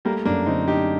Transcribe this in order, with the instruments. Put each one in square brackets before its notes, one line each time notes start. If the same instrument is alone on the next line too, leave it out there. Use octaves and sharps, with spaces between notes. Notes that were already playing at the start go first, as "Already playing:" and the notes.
[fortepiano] G3 A#3 [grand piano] A3
[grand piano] F#2 [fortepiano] A#3 D4
[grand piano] D3 [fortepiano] C4 D#4
[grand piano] D4 [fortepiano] D#4 G4